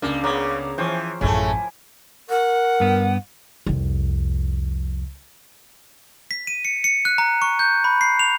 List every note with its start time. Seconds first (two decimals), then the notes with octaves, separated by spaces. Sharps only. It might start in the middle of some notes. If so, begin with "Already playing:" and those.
0.02 C#2 A#3 D4
0.24 C#3 A#3 B3 A#5
0.78 E3 F3 C#4 C5 G5
1.21 A1 F#2 C#3 A3 E4 G#5
2.30 A#4 F#5
2.80 G2 B3
3.66 C2 F2
6.31 B6
6.47 D#7
6.65 C#7
6.84 C#7
7.05 F#6
7.18 A#5
7.42 C#6
7.59 G6
7.84 B5
8.01 C7
8.19 F7